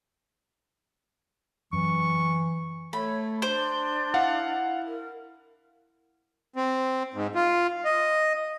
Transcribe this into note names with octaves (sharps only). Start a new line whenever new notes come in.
F#2 E3 C#6
A3 C#5 B5
D4 C5 G6
E4 F5 F#5
A#4
C4
G#2
F4
D#5